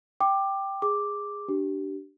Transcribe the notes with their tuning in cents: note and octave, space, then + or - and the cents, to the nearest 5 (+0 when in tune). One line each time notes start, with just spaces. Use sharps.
G5 -5 D6 +15
G#4 -15 D6 +0
D4 +0 G4 -30